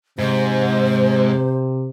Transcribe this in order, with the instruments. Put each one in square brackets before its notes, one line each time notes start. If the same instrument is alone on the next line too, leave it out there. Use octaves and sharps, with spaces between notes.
[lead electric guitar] G#2 [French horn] C3 [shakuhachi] C5